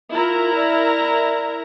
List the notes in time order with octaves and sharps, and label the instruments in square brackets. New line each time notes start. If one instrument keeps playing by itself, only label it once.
[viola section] E4 A#4 A#5 [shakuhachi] F4
[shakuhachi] D5